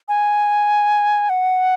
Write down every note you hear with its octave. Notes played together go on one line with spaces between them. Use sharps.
G#5
F#5